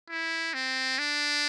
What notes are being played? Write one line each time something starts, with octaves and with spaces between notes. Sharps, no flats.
E4
C4
D4